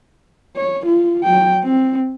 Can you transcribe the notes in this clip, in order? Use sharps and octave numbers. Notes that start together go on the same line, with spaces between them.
C#5
F4
F#3 G5
C4